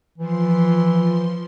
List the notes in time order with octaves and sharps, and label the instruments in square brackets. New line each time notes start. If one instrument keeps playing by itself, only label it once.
[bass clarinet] E3 [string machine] F3 C6